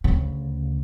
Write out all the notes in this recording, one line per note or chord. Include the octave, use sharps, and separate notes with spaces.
D2 C#3